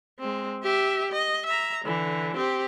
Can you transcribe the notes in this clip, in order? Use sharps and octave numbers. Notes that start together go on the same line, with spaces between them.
G#3 C4
G4 E5
D#5
E5 A#5
D3 E3
C4 G4